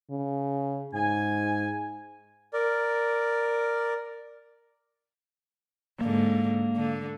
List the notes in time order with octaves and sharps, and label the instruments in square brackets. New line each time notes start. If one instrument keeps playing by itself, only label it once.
[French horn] C#3
[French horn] G#2 [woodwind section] G#5
[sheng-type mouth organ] A#4 D5
[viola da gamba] G#2 D3 [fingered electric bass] A#3
[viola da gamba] D3